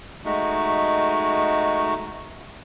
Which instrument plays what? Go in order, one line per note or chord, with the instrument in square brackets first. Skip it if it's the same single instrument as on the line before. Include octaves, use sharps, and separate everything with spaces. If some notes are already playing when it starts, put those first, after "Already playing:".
[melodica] G#3 A3 D#4 F#4